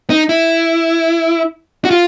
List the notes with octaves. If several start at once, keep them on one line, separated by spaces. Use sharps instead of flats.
D#4
E4
F#4
F4